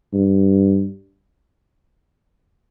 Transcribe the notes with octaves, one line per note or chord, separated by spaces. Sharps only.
G2